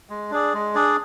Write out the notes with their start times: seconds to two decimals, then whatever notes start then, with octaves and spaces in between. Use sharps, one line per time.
0.10 G#3
0.31 D4 G#4 D5
0.54 G#3
0.75 D4 G#4 D5